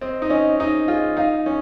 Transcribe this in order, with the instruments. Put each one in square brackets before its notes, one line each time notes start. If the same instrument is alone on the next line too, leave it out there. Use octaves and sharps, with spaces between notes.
[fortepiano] C4 [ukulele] D#5
[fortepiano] D#4
[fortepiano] C#4 [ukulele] D#5
[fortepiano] D#4 [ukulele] D#5
[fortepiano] F4 [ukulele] G#4
[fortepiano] D#4 [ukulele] F5
[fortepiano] C#4 [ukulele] D#4